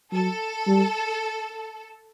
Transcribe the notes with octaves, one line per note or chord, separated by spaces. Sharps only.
F#3 A4
G3